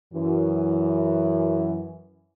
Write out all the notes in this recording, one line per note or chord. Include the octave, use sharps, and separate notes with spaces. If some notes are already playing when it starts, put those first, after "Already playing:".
F#2 E3